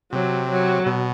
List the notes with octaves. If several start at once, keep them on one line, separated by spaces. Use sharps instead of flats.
C3 F#3
F#3
B2